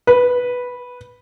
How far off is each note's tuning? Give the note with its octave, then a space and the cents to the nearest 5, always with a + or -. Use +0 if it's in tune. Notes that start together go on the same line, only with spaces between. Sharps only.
B4 -5